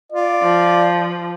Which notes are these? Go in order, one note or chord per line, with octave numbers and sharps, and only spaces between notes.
F4 D5
F3